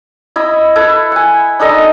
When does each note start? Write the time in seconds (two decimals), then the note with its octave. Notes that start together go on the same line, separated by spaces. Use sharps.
0.36 E4 D#5 B5
0.75 E4 A4 B4
1.12 F#5 G#5
1.59 D4 D#4 A4 D#5